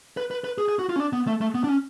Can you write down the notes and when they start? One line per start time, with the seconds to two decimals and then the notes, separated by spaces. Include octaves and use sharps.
0.17 B4
0.31 B4
0.44 B4
0.58 G#4
0.69 G#4
0.79 F#4
0.89 F4
0.96 C#4
1.00 D4
1.13 B3
1.27 A3
1.41 A3
1.55 B3
1.64 D4
1.69 C#4